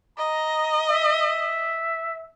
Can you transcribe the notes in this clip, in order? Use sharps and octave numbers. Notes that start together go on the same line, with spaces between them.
D#5 A#5
E5